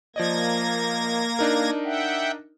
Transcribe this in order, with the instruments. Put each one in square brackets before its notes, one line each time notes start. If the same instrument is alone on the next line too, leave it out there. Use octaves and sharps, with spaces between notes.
[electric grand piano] F3 D5 D#5 [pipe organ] A#3 G#6 A#6
[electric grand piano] D4 D#4 A#4
[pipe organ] E5 F#5 G5